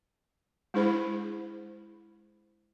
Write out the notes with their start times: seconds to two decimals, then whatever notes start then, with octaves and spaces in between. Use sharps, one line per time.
0.74 G#3 D4 E4 G#4 C5 B5